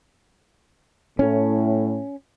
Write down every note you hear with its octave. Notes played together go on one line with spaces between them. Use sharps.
A2 C#4